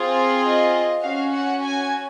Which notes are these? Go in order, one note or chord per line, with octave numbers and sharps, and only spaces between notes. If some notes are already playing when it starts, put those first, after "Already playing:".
Already playing: C4 F4 G#4
D#5
C#4 F#4 F5
F#5
G#5